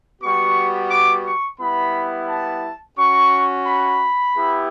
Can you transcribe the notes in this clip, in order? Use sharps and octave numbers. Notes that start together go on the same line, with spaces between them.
G3 B3 F#4 C#6
D6
C#6
G3 B3 E4 B5
A5
C#4 F#4 C#6
B5
B3 E4 G4